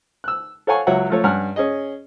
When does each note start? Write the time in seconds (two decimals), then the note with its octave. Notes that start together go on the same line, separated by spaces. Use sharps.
0.24 E6 F#6
0.67 A4 C#5 F5 F#5 G#5 C#6
0.87 C#2 F#3 C#5 E5 F#5
1.10 F3 A3 C#5
1.24 G2 C#4 F#5 G#5 F6
1.56 C#4 G#4 D#5